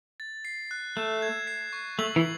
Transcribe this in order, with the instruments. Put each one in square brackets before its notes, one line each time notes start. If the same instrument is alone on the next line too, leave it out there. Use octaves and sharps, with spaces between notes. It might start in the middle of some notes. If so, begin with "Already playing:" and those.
[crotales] A6
C7
F#6
[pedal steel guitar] A3 [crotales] E7
[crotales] G#6
C7
C#6
[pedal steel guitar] A3 [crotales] F#7
[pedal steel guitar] E3